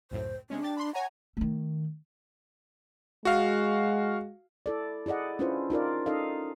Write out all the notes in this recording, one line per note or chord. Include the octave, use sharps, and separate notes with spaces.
C#2 F#2 A2 C5
C3 G#3 C#4 D4
G4 A6
B5 C6
C#5 F#5 G#5 A#5
D#3 A3
G#3 F#4 F5
E4 A4 D5
E4 G#4 D5 D#5 F#5
C#4 D4 E4 F4 B4 C5
D#4 F4 A#4 D5
C#4 D#4 A4 D#5 F5